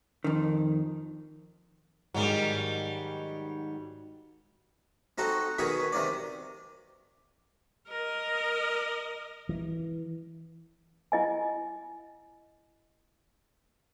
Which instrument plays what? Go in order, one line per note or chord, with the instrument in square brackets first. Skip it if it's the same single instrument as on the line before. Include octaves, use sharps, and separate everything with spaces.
[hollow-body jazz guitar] F2 D#3
[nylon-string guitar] G#2 D#3 [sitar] F#3 G3
[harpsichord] C4 D#4 F#4 A4
B2 D#3 G#4 C#5 B5
C3 D#3 D5
[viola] A#4 D#5
[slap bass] E3
[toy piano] E4 D#5 G#5